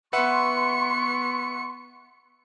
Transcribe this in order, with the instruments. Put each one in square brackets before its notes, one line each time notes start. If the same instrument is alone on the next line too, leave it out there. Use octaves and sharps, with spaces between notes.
[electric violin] B3 C#7 [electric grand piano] B4 E5 F#5 [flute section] C6 C#6